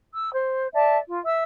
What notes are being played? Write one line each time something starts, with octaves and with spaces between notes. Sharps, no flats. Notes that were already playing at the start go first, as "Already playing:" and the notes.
E6
C5
D5 E5 A5
F4
E5 E6